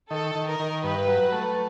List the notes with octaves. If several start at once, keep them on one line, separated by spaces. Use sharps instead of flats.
D#3 A4
D#3
A#4
D#3
G2 B4
F#3
A3